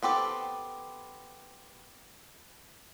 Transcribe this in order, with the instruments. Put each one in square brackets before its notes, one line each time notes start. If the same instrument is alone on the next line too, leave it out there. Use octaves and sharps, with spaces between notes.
[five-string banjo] B3 C4 G4 A4